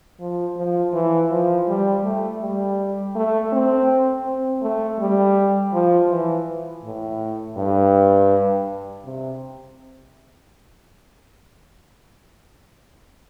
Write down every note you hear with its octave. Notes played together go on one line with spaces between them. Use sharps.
F3
F3
E3
F3
G3
A3
G3
A3
C4
C4
A3
G3
F3
E3
A2
G2
C3